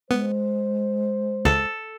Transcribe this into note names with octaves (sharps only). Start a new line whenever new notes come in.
G#3 B3 C5
C#2 A4